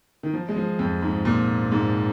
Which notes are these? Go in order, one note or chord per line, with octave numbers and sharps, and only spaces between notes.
D#3
F3
G#3
F3
F2
G#2
A#2
G#2